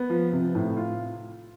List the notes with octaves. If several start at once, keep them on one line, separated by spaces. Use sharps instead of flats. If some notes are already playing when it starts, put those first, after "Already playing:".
Already playing: B3
F3
C3
A2
F4